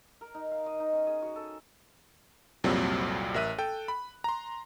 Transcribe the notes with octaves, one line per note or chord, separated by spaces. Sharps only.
A#4
D#4
F5
D#5
D#4
C#4
G#4
F#4
A4
C2 F2 A#2 F#3 G3 C4
A1 A#4 E5 F#6 D#7
A4 G5
B5
A#5 C6